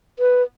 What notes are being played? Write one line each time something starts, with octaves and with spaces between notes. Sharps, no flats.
B4